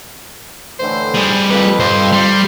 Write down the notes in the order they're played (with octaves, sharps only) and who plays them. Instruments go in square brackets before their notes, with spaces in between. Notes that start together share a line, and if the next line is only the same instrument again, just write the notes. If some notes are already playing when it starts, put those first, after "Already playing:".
[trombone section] A2 D3 E3 [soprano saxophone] C5
[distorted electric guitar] G3 G#4
[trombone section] F2 [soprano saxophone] B4
[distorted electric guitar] G2 [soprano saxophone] C5
[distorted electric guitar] G3 [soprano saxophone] C6